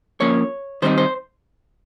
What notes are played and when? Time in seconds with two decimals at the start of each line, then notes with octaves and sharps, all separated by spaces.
0.20 F3 A#3 C#4 C#5
0.82 D#3 G3 C4 D#4 C5
0.98 C5